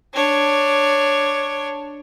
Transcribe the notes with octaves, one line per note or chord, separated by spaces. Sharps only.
D4 C#5